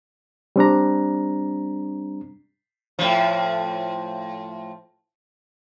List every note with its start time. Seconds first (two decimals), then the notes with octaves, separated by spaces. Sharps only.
0.56 G3 C4 D4 A#5
2.99 A2 F3